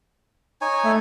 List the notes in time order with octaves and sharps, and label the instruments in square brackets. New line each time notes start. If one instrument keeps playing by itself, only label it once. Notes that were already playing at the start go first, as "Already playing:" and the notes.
[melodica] D#4 C#5 G#5
[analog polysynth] A3